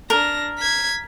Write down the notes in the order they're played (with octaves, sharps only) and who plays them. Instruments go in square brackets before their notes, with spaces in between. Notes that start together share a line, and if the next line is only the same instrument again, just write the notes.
[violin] D4 A#6 [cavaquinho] A#4
[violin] G#6 B6